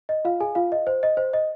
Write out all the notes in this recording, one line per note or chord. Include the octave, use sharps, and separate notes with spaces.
D#5
F4 F5
G#4 G#5
F4 F5
D#5
C5
D#5
C5
D#5